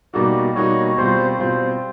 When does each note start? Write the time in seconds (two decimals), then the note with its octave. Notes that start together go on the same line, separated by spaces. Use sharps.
0.14 B2 G3 A#3 D#4 F#4 D5
0.55 B2 G3 A#3 D#4 F#4 C#5
0.97 B2 G3 C4 F4 C5
1.39 B2 G3 C4 F4 C5